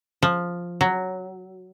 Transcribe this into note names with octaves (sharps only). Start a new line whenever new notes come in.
F3
F#3